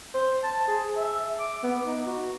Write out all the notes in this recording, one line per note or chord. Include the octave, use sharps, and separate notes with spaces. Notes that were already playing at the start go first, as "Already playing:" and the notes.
C5
A5
G#4
E5
D6
B3
D#4
F#4